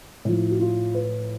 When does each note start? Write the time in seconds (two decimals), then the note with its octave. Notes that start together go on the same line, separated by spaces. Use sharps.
0.25 A2 F3
0.50 F#4
0.60 F4
0.95 B4